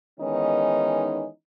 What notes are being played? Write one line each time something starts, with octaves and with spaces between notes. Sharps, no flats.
D#3 E3 G#3 B3 C#4 D#4